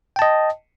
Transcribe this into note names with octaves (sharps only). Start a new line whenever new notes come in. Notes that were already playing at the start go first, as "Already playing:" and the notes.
D#5 G5 A5